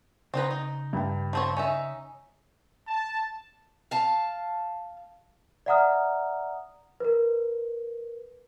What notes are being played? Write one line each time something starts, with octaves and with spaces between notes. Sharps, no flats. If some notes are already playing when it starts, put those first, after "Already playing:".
C#3 C4 D#4 B4 A#5
D#4
G2 G5
F3 C4 C#5
C#4 D#4 D#5 E5
A5
F5 A5
D5 E5 F#5 A#5 D#6 F6
A#4 B4